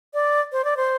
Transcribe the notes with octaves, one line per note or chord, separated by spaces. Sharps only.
D5
C5
D5
C5